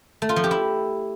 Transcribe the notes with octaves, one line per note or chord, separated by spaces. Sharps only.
A3
F4
F3
G4
E4